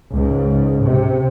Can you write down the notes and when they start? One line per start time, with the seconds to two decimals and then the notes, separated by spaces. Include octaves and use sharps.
0.13 C#2 G#2
0.84 C3